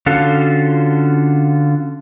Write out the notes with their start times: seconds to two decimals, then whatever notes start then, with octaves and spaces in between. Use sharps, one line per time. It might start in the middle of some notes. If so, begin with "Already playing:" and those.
0.06 D3 C#4 F4 F#4 A4